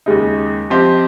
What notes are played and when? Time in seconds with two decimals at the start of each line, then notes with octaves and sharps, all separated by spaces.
0.06 D#2 C#3 G#3 D#4
0.70 F3 C4 G4 C5 D#5